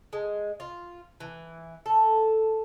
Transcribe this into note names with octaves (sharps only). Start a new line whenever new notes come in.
G#3
F4
E3
A4